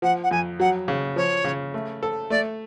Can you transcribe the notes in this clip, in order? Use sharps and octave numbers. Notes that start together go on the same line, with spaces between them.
F3 F#5
F#5
F2 G#5
F#3 F#5
C#3
F3 C#5
C#3
A3
A4
A3 D5